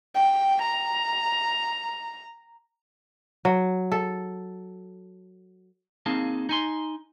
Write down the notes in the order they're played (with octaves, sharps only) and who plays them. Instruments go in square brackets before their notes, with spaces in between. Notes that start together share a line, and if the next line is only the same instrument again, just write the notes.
[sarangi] G5
A#5
[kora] F#3
A4
[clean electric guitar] A#3 C4 D#4 G#4 F5 A5
D#4 G#5 C6